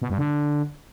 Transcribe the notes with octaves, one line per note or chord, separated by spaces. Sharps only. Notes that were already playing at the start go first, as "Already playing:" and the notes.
B2
G2
D3